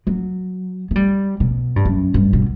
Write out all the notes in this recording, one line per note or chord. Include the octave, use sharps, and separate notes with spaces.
F#3
A3
G3
B2
G2
F#2
G2
B2